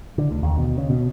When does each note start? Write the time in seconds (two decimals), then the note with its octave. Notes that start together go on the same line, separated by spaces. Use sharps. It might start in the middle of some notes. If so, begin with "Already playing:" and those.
0.18 D3
0.31 D2
0.43 D#2
0.58 B2
0.78 C#3
0.90 B2